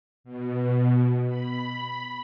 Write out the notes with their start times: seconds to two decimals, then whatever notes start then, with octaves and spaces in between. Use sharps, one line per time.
0.24 B2
1.27 B5